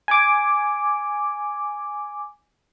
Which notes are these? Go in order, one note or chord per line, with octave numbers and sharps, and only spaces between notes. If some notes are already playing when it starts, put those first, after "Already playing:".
G#5 D6